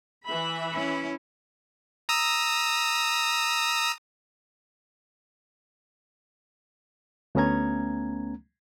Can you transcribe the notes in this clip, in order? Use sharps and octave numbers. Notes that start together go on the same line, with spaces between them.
E3 E5 B5
C#4 E4
A#5 D#6 E6
D2 A3 B3 C#4 A#5 G#6